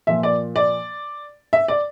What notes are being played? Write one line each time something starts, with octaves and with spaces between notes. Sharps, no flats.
A#2 F3 A#3 E5
D5
D5
E5
D5